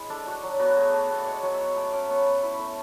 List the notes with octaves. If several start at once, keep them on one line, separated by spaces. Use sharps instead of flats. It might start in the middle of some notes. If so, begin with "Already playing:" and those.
Already playing: G#3 E4 B5
D4 A4
D4 F#4
F#3
B3 F#4
A3 G#4
A3
B3 A4
D5
G#3 C#5
F#3 C#5
E5
B3
A3 D6
C#4 D6
B3 C#6
B3 A5 B5
E4 B5
A3